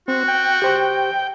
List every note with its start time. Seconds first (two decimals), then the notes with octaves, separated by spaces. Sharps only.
0.08 C4 F#4
0.28 G5
0.62 G4 C5 C#6